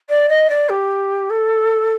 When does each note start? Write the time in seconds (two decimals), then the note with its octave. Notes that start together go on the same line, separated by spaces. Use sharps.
0.09 D5
0.29 D#5
0.49 D5
0.69 G4
1.30 A4